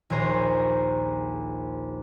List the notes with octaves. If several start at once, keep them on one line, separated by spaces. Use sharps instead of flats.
A#1 D#2 G#4 C5 A#5